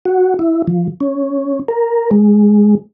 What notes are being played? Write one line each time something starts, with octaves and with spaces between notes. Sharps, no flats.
F#4
E4
F3
C#4
A#4
G#3